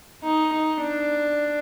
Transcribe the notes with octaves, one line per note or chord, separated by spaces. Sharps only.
D#4
D#4
D4